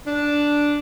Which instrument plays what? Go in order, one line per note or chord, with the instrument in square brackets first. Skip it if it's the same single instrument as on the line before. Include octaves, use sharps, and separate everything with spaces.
[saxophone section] D4